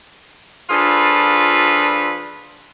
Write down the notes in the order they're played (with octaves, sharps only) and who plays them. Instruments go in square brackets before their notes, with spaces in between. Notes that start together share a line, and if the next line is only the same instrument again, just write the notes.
[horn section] F3 D4 F4 G#4 A4 B4